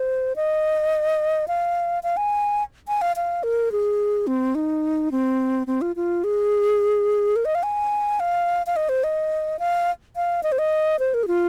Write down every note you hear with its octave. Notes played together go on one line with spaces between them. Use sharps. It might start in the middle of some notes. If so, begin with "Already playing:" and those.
Already playing: C5
D#5
F5
F5
G#5
G#5
F5
F5
A#4
G#4
C4
D#4
C4
C4
F4
F4
G#4
A#4
D#5
F5
G#5
F5
F5
D#5
C5
D#5
F5
F5
D#5
C5
D#5
C5
A#4
G#4
F4